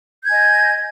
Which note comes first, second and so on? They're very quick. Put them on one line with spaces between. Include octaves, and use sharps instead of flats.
G6 G#6 G#5 D#5